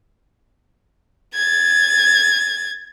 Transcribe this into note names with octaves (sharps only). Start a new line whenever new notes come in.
G#6 A6